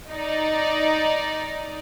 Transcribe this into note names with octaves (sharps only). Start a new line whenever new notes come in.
D#4 D5